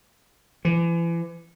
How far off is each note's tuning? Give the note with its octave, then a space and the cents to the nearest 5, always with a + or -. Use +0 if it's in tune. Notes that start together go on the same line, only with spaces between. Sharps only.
E3 +35